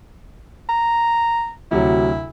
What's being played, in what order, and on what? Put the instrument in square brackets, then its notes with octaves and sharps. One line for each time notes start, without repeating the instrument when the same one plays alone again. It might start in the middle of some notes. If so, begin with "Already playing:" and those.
[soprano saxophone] A#5
[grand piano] D2 C3 F#3 [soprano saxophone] E4